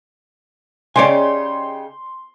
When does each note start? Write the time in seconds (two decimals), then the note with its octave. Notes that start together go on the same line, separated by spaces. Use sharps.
0.96 C#3 D#4 G4 C#5 D5 G#5 C6